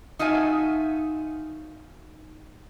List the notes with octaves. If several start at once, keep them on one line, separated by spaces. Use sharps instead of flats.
D#4 F4 F#4 E5 G#5